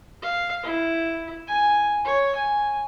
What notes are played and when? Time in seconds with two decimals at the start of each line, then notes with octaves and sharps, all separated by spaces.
0.22 F5
0.63 E4
1.48 G#5
2.05 C#5
2.36 G#5